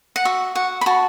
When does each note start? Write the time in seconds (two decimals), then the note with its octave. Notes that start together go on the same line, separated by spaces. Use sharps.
0.16 F#5
0.25 F#4 E5
0.55 F#4 F#5
0.81 B5
0.86 F#4 A5